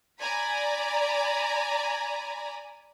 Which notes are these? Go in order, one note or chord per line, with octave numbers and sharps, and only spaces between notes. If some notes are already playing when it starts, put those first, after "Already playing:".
D5 G#5 A#5 B5